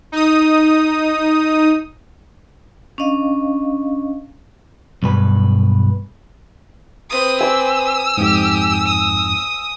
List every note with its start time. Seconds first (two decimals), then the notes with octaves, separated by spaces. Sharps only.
0.12 D#4 D#6
2.98 C#4 D4 D#5 F5
5.03 B1 G2 B4
7.10 C4 B4 D#6
7.41 G#5 D6 E6
8.17 F2 G#2 G4
8.86 D#6